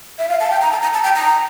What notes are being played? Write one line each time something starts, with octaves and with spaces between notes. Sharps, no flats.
E5
F5
A5
G5
A#5
A5
A#5
A5
G5
A#5